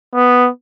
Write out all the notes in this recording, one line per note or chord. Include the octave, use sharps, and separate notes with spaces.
B3